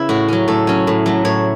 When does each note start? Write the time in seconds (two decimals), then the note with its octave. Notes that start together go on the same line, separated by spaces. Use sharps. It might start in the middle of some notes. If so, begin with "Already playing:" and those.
Already playing: C#3 B3 E4
0.09 A2 F#4
0.28 F#3 C#4
0.48 A2 A4
0.67 F#3 C#4
0.87 A2
1.06 F#3 A3
1.25 A2 C#5